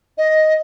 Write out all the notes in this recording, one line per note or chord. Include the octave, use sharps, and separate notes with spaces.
D#5